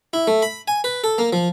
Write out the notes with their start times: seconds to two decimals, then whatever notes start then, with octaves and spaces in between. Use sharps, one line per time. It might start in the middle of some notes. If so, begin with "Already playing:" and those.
0.13 E4
0.27 A3
0.42 B5
0.68 G#5
0.84 B4
1.04 A4
1.18 A#3
1.33 F3